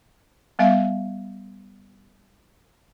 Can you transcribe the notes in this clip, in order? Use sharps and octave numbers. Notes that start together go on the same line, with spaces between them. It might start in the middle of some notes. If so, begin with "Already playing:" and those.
G3 B3 E5 F5